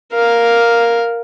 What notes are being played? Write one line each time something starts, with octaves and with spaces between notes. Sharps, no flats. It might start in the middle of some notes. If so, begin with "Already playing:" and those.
A#4 F5